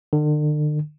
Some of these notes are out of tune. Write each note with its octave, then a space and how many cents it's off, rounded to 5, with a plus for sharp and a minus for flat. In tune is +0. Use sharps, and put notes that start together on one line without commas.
D3 +40